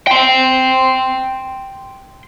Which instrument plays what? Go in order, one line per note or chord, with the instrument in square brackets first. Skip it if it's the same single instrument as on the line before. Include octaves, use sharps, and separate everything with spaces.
[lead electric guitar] G5 C6